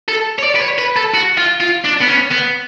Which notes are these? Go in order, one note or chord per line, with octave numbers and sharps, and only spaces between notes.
A4
C#5
D5
B4
C#5
B4
A4
F#4
F4
F4
D4
B3
C#4
B3